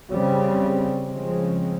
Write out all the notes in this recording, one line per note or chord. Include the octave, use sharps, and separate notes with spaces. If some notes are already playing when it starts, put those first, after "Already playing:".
C#3 G3 C4
C#3 F3 G#3 C4